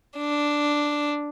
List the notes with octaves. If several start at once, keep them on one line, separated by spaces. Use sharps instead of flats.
D4